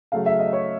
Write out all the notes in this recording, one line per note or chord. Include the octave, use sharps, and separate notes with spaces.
C#3 F#3 A3 F5
E5
D#5
C#5